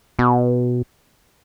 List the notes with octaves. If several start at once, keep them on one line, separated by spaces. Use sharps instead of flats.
B2